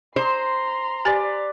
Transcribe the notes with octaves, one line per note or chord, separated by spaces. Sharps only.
C5 A#5 C6
G4 B4 D5 G#5 A6